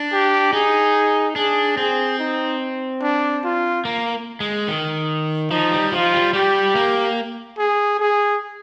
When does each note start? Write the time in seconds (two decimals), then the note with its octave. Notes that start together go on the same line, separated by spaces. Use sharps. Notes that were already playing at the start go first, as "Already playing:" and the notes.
Already playing: D4
0.12 G4
0.53 D#4 G#4
1.36 D4 G#4
1.77 C4 G#4
2.19 D#4
3.02 D4
3.44 F4
3.85 A#3
4.40 G#3
4.68 D#3
5.51 F3 D#4
5.71 G3
5.92 F3 F4
6.13 G3
6.34 G3 G4
6.75 A#3
7.58 G#4
8.00 G#4